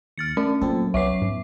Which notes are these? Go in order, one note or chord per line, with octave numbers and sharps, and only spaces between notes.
D#2 F6 A6 C#7
A3 C#4 D4
A#2 F#3 C4 A4
C2 B3 C#4 E5 D6 C7
G#2